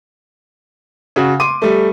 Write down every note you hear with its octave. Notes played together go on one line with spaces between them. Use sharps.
C#3 F#4
C6 D6 D#7
G3 A3